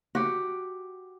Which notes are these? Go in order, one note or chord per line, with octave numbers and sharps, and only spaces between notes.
F#4 G4